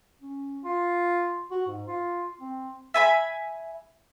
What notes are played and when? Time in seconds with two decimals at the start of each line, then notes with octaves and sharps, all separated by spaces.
0.22 C#4
0.64 F4
1.51 F#4
1.67 G#2
1.87 F4
2.41 C4
2.94 E5 G#5 B5